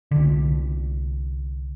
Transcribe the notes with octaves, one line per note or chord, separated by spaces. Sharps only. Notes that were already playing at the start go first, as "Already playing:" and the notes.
C2 D3